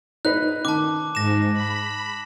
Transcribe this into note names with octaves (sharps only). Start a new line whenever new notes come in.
D#4 B4 F#6
D#3 A5 D6
G#2 A#6 E7
B5